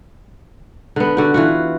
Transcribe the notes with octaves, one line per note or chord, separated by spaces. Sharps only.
D3 B3
D3 F#4
E3 F4 F#4